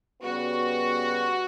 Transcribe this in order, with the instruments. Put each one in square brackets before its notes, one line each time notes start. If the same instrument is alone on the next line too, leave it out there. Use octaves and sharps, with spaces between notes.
[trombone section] C#3 G3 B3 [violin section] F#4